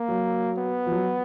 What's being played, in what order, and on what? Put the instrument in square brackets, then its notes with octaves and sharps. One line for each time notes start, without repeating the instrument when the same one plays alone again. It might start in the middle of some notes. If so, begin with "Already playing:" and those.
Already playing: [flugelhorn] A#3
[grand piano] F#3
[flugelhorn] B3
[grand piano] F3
F#3